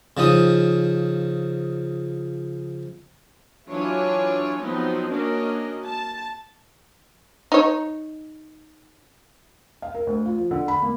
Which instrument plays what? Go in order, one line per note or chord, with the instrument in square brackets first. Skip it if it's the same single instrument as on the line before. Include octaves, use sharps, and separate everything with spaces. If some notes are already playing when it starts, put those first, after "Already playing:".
[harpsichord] C#3 F3 D#4 D#6
[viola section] E3 F#3 D4 F4 C#5 G#5
F3 F#3 B3 C4 D#4
A#3 C#4 D4 F#4 A#4 D#5
A5
[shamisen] D#4 C#5
[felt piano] F5
A#4
D2
F4
F3
D3
B5
A#3